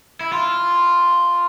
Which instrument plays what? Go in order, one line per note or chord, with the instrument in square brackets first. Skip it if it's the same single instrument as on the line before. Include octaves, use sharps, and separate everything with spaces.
[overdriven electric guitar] E4
F4